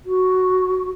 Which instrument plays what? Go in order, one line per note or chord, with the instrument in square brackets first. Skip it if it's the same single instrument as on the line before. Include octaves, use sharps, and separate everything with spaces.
[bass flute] F#4